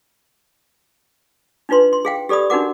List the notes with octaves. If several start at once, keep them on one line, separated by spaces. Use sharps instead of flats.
D4 D#4 F4 B4 C6
C6
G#4 F5 G5
G4 A4 D5 B5 D#6
D4 D#4 F#4 A#4 F#5 D6